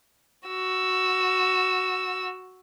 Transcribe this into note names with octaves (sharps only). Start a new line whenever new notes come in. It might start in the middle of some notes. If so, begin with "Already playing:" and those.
F#4 E6